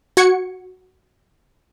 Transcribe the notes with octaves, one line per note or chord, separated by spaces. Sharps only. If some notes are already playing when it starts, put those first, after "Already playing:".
F#4 G#6 C#7